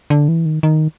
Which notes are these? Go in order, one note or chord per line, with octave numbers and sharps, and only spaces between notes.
D3
E3
D#3
D#3